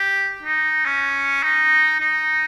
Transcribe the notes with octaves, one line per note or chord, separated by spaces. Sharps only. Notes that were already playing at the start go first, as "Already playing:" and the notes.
Already playing: G4
D#4
C#4
D#4
D#4